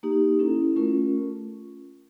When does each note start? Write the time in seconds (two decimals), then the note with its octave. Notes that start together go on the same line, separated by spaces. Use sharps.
0.03 A#3 D#4 G4
0.39 C#4 E4 A4
0.76 A3 C#4 F4 A#4